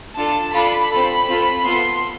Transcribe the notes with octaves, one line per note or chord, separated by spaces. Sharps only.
D4 F4 A4 A5
D4 F4 A4 B5
C4 F4 A4
C4 F4 A4
B3 F4 A4 C6